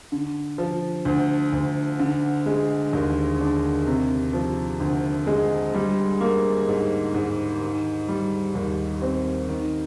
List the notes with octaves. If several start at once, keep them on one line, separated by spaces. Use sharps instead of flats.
D3
F3
D2
D2
D3
G#3
D#2
D4
C3
F3
D2
G#3
G3
A#3
G#2
G#2
D#3
G3
D#2
C4
D#3